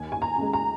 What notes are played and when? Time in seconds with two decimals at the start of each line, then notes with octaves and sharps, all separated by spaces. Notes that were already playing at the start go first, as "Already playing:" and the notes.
Already playing: D#2 G#5
0.12 G#5
0.22 A#5
0.38 C#3 G#3
0.53 A#5